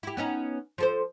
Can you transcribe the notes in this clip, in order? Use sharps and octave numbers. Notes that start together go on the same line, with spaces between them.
E4 G4
B3 C#4 D#4
F3 A4 C5